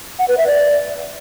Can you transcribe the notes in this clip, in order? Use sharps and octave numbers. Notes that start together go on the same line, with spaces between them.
F#5
B4
E5
D5